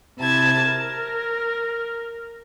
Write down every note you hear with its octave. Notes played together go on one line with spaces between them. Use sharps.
C3 E4 A5 G#6
A#4